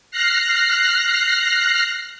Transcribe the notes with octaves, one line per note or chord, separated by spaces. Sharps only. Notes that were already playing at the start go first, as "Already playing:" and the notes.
F6 F#6 A#6 C7